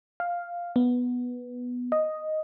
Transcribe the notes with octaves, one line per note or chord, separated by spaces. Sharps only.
F5
B3
D#5